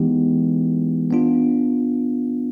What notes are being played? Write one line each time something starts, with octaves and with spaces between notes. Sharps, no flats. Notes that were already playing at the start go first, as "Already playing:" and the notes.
Already playing: E3 G#3 B3 D#4 G4
B3 D4 F4